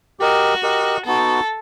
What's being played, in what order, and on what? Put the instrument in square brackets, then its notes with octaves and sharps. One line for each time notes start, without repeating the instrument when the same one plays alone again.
[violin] F#4 [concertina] G4 A#4 D#5
[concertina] G4 A#4 D#5
[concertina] B3 D#4 F#4 [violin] A4